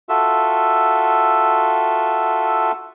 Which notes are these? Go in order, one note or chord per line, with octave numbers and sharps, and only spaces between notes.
F4 F#4 A4 E5